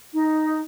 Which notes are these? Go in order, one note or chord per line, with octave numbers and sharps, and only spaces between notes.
D#4